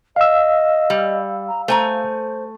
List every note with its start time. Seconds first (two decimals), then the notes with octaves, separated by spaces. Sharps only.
0.16 D#5 F5 E6
0.90 G3
1.48 A#5
1.68 A3 C5 G#5 A#5